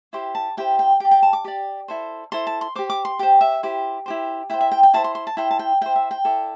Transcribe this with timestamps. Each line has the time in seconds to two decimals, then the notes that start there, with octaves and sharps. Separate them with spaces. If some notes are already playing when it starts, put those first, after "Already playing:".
0.13 E4 G4 C5 C6
0.35 A5
0.57 E4 G4 C5 G5
0.79 G5
1.00 G4 D5 G5
1.11 G5
1.22 A5
1.33 D6
1.45 G4 D5
1.88 E4 A4 C5
2.32 E4 A4 C5 C6
2.47 A5
2.61 C6
2.75 G4 C5 D6
2.90 D6
3.05 C6
3.19 G4 C5 G5
3.41 E5
3.63 E4 G4 C5
4.06 E4 G4 C5
4.50 E4 C5 G5
4.61 E5
4.72 G5
4.83 G5
4.94 E4 C5 A5
5.04 C6
5.15 C6
5.27 A5
5.37 E4 C5 G5
5.51 A5
5.59 G5
5.81 E4 C5 G5
5.96 E5
6.11 G5
6.25 E4 A4 D5